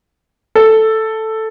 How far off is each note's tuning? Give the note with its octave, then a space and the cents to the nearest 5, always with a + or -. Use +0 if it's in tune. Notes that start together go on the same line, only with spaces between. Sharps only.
A4 +0